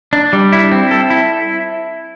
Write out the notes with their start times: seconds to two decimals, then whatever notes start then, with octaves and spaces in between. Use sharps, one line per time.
0.13 D4
0.33 G3
0.52 E4
0.71 C4
0.91 A4
1.10 E4